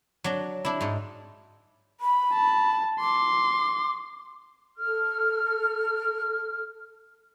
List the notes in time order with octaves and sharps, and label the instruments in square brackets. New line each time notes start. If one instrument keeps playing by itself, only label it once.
[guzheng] F#3 D4
D4 E4
G#2 D#4
[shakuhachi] B5
[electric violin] A5
[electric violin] C6 [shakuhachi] D6
[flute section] A4 F6